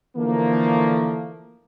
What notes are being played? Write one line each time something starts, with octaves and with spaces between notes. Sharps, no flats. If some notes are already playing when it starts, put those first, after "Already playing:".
D3 E3 F3 A3 A#3